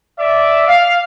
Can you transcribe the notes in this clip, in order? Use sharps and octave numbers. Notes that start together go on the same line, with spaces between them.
D5 E5
F5